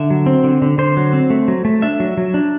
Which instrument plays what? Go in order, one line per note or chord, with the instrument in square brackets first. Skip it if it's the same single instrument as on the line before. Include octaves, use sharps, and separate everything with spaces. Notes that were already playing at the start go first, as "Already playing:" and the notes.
Already playing: [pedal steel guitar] D3 E5
F#3
C4
D3
D3
D3 C5
F#3
C4
A3
F#3
A3
D4 E5
F#3
F#3
D4